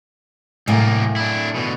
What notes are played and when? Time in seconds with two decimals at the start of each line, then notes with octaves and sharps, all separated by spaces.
0.68 C2 F#2 A2 A#3 G#5
1.16 D4 E4
1.56 B2 D3